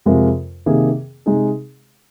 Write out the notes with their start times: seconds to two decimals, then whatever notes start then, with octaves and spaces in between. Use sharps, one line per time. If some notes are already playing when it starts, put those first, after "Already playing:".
0.06 F2 C3 G#3 F4 A#4
0.66 C3 D#3 A#3 G#4
1.26 C3 G#3 D#4 G#4